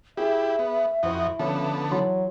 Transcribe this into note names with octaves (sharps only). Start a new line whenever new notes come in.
E4 G4 G#4 E5
B3
F2 E4 F#4 C5 D#5
D3 F3 B3 C#4 A4
E3 F#3 C6